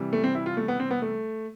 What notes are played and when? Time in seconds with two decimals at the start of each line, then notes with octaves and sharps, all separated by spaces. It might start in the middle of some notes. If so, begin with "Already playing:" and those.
Already playing: C3 E3 G3
0.13 A3
0.24 C4
0.35 E4
0.46 F4
0.57 A3
0.68 B3
0.80 C4
0.91 B3
1.02 A3